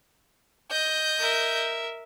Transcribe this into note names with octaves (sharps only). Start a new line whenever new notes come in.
D#5 G6
A#4 E5